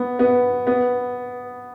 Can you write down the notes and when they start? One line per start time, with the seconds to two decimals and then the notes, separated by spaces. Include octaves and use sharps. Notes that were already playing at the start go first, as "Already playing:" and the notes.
Already playing: B3
0.19 B3
0.67 B3